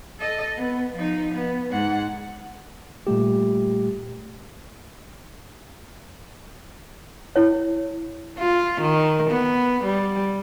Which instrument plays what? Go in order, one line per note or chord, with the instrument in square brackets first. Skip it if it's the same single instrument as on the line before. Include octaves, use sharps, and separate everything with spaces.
[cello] A4 D#5
B3
F3 D#4
B3
G#2 F#5
[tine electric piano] A#2 G3 A3 G4
[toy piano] E4 C#5
[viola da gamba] F4
D#3
B3
G3